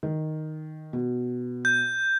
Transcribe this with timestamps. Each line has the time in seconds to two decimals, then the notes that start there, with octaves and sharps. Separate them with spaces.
0.03 D#3
0.93 B2
1.65 G6